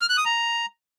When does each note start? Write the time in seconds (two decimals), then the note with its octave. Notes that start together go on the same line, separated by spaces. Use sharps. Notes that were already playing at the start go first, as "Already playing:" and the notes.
0.01 F6
0.09 F#6
0.17 D#6
0.25 A#5